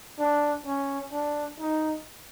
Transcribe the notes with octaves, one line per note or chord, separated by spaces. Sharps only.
D4
C#4
D4
D#4